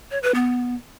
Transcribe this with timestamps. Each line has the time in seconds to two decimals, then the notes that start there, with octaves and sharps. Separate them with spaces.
0.11 C#5
0.23 B4
0.35 B3